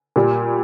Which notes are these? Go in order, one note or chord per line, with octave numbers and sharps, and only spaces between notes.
A#2 G3